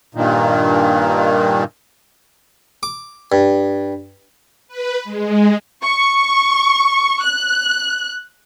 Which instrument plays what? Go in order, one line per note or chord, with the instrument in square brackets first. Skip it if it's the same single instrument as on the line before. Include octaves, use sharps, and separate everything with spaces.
[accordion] G2 A#2 D#3
[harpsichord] D6
G2
[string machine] B4
G#3
[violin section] C#6
F#6